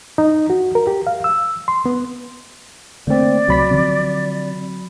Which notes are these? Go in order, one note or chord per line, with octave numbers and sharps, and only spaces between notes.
D#4
F#4
A#4
G4
F5
E6
C6
B3
D3 A3 A#3 C4 D5
C#2 C3 F#3 B5 B6
D3 F3 C4